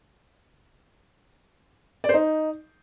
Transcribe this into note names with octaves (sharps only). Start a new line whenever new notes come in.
D5
C5
D#4